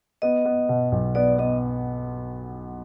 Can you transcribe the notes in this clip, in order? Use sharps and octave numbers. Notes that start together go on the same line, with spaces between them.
B3 D#5
B3
B2
B1
B3 D5
B3 D#5